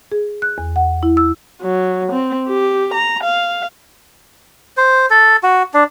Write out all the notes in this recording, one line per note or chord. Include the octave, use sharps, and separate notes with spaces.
G#4
F#6
E2
F#5
E4
E6
F#3
C4
G4
A#5
F5
C5
A4
F#4
D4